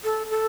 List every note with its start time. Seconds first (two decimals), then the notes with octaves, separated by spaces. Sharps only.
0.04 A4
0.30 A4